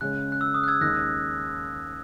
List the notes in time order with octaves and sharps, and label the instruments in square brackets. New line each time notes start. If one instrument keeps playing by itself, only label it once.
[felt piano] C#3 G#3 C#4 [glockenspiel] F#6
[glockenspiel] F#6
E6
D#6
F#6
E6 G#6
[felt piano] D#2 D#3 G#3 C#4 [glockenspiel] F#6 A#6